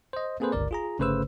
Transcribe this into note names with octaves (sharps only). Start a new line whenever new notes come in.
C5 D#5
A#3 C4 G#4 A4 B4 C5
G1 C#2 A#4 D5
F4 G#4 A#5
G1 C#3 A3 B4 C5 E6